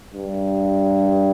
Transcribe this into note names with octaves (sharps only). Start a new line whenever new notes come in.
G2